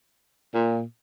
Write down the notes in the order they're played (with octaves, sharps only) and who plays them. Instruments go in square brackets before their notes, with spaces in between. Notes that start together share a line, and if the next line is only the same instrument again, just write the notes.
[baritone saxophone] A#2